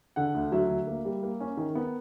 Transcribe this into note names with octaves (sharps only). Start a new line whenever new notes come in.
D3 F#5
D2
F#3 E5
D2
A#3
G3
A#3
C#4
D#3 A#4
B3